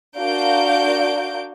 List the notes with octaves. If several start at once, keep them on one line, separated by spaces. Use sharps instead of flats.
D4 F#4 A#4 F5 G6 D7